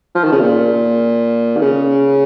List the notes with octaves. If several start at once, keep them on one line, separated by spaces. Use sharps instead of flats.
F3
D#3
C#3
A#2
D#3
C#3